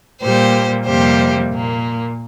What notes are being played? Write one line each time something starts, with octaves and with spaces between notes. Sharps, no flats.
A#2 G3 A#3 G4 C5
F2 C3 G3 A#3 G4 C5
A#2 A#3